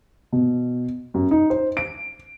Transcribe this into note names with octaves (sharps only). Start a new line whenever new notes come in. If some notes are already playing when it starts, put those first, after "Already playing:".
B2
F#2
D#4
C5
D7